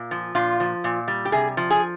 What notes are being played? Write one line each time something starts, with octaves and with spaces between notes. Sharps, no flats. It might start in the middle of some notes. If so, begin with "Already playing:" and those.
Already playing: A#2
F3
A#2 F4
F3
A#2
G3
G4
C3 G#4
F3
G#4